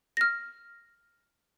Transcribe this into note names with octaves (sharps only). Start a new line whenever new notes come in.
F6 A#6